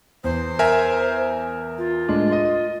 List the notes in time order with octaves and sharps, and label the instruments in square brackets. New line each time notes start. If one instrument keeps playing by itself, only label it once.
[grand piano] E2 [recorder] C5
[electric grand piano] A#4 E5 G#5
[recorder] F4
[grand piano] A2 G#3 D4
D#5